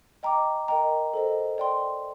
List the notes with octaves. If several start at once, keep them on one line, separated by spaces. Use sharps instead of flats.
D#5 G5 A#5 D6
A#4 D#5 G5 A#5
A4 C5 D#5
D5 G5 C6